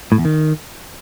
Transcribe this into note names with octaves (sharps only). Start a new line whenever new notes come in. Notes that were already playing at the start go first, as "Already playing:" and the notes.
A2
E2
D#3